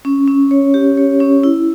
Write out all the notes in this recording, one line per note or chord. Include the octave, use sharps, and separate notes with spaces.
C#4
C#4
C#5
G4
C#5
C#4
E4